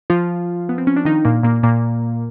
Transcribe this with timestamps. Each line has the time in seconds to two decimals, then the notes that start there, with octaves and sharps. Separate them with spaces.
0.10 F3 F4
0.69 B3
0.78 C4
0.87 C#4
0.96 D4
1.05 D#3 D#4
1.25 A#2 A#3
1.43 A#2 A#3
1.63 A#2 A#3